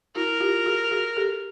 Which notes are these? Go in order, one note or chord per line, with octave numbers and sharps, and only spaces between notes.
E4 F#4 A#4
F4 G4
F#4 G#4
F#4 G#4
G4 A4